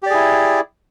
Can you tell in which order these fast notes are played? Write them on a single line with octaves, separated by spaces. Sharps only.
G4 D5 G#4 E4